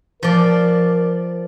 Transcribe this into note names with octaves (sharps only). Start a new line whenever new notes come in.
F3 A#4 D5